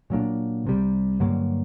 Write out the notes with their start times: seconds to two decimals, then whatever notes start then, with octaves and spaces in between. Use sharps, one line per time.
0.10 A#2 F#3 A#3 D4
0.65 C2 C3 G3
1.20 G2 D3 F#3 A#3